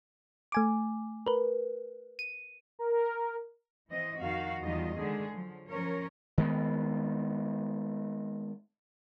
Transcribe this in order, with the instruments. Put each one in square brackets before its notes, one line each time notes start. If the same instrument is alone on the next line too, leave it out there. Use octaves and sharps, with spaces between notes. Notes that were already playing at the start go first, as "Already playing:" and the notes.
[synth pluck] A3 G#5 D6
A#4 B4
D#7
[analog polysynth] A#4
[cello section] E3 C4 D#5
F2 D#3 F#4 F5
E2 D#3 G3 F4 D#5
D3 D#3 G#3 G#4
F3 F#3
F3 C#4 A#4 C#5
[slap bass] D#3 G#3 B3